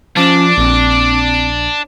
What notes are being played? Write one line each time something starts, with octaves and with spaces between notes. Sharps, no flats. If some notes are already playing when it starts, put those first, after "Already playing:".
F3 C#4 D4 D6
A#1 C4